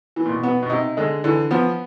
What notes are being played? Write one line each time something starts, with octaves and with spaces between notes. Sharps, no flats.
E3
A#2
B2
B3
B2
C3 D#4
D3 G#3
D3 E3
F3 B3